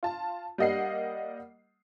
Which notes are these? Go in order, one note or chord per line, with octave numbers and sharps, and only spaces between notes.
F4 A5
G3 A#3 D#5 F#5 C7